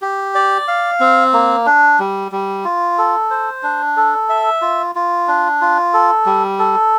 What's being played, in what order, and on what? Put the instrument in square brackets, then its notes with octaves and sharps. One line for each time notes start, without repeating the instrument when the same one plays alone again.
[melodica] G4
D5
F5
C4
A#3
D4
G3
G3
F4
A4
C5
D4
A4
E5
F4
F4
D4
F4
A4
G3
A4